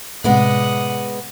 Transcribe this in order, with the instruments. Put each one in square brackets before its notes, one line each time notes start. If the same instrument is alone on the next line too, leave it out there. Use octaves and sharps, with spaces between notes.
[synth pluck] A2 C3 [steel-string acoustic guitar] G#3 B3 D5 [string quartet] F#5 D#6